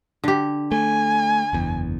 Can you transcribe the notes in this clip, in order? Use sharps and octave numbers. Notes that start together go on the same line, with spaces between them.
D3 G4
A3 G#5
F#1 E2